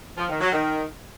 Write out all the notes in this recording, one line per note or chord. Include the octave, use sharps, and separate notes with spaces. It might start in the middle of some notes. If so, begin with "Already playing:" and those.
F3
D#3
F#3
D#3